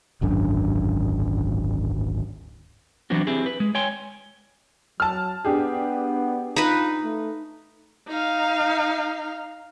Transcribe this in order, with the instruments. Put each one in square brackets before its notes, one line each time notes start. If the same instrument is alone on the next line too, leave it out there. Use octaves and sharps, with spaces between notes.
[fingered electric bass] D1 G#1 F#2 D4
[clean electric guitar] E3 F#3 B3 C4 D4 F#4
C4 E4 G4 G#4
B4
G#3
C#5 G5 G#5 C6
[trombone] F#3 [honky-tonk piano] A5 F6
[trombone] B3 [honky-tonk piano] D4 G4 G#4
[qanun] D#4 B4 [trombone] F4
[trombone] A3
[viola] D#4 F5